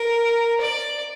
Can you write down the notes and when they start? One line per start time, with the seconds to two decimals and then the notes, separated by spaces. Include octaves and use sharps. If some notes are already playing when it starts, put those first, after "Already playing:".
Already playing: A#4
0.61 D5